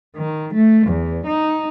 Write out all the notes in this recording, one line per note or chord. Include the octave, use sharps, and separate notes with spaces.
D#3
A3
E2
D#4